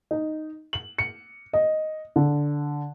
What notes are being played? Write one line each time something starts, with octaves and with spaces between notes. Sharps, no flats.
D#4
F#7
C#7
D#5
D3